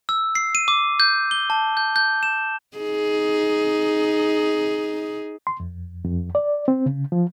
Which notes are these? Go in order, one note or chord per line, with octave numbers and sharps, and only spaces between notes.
E6
C7
D#7
D6
G6
G7
A5
G6
G6
E7
D#4 G#4
C6
F2
F2
D5
C4
C#3
F3